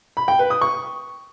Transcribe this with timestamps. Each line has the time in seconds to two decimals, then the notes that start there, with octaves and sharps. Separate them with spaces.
0.17 B5
0.28 G5
0.39 B4
0.50 D#6
0.61 C#6